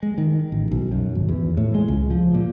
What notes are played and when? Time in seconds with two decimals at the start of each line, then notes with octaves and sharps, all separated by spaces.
0.03 G#3
0.18 D#3
0.52 A1
0.71 B1
0.92 F#2
1.15 G#1
1.29 E2
1.57 A2
1.75 G#3
1.88 C#2
2.10 F3
2.34 A#2